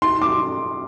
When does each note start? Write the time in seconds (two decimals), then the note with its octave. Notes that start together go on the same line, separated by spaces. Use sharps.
0.02 C6
0.22 D6